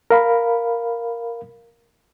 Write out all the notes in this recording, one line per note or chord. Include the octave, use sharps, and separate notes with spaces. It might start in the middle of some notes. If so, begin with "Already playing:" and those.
A#4 F5 B5